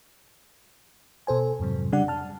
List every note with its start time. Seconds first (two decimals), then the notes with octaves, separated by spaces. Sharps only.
1.27 B2 A4 C5 G#5
1.60 F2 G#2 C3 F#3
1.92 C#3 G3 D4 D5 F#5
2.08 A5 F6